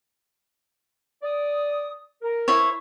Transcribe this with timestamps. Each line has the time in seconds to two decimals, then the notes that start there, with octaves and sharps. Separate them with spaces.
1.23 D5 D#6
2.22 A#4
2.48 E4 C5 C#5